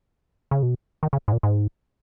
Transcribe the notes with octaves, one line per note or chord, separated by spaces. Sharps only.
C#3
B2
D#3
C#3
G#2
A#2
G#2